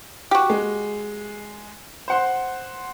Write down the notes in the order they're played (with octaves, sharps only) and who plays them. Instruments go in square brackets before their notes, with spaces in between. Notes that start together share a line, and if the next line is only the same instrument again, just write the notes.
[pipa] F#4 G4
[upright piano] G#3
C5 F#5 C6